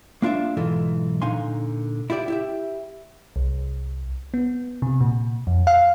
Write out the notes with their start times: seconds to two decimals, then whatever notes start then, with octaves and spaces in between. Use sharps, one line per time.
0.22 A#3 D4 F4 D5 E5
0.57 B1 G#2 E3 F4 A4
1.22 A#2 D3 D#4 F5 G#5 C6
2.10 E4 F4 G4 D5
2.28 E4 G4 E5
3.36 C2
4.34 B3
4.82 C3
5.01 A#2
5.47 F2
5.67 F5